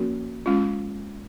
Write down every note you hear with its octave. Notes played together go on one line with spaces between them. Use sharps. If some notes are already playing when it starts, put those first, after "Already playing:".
Already playing: F3 A#3 C#4 F#4 A#4
G#3 C#4 F4